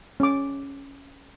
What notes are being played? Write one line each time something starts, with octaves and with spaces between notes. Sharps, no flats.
C#4 D6